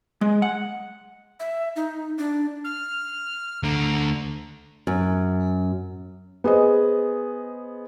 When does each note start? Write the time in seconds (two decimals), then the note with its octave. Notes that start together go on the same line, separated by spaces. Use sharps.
0.21 G#3
0.42 F#5
1.40 E5
1.76 D#4
2.18 D4
2.64 F6
3.64 D2 D3 A#5
4.87 F#2
6.44 B3 G#4 C5 D#5